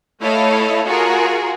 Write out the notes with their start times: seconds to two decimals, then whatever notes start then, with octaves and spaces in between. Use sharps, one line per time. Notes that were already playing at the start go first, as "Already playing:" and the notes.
0.21 A3 E4 A4 C#5 D#5 F5
0.86 F4 F#4 G#4 A#4